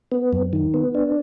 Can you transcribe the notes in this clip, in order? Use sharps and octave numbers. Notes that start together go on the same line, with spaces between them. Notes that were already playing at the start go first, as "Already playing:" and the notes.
B3
F#2
D#3
B3
D4